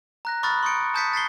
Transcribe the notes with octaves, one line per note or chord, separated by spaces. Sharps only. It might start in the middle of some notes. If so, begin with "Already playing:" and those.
A#5 F#6 A#6
B5 C#6 D#6 F6 F#6 A6
C6 C#6 D#6 G6 C#7 D7
A5 D#6 G6 A6 B6 C#7
A6 B6 C7 G7